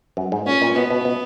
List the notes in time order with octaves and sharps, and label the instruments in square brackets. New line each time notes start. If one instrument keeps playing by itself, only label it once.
[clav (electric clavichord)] F#2
G#2
[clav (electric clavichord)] A#2 [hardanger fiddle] C#4
[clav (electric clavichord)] A#2
[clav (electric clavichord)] B2 [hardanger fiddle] B3
[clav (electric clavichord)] B2
B2